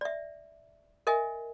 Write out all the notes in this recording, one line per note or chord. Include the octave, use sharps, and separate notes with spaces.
D5 E5
A#4 D#5 E5 G#5